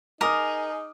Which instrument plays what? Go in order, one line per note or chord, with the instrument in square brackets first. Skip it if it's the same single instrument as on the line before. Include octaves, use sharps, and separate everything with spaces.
[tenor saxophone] D#4 [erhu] G#4 [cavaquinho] A#4 [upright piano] D6 D#6 F6